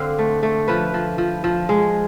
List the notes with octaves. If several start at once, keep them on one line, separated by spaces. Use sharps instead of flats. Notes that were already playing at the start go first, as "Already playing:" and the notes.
Already playing: D3 C4 F5
A3
A3
F3 B4
F3
F3
F3
G#3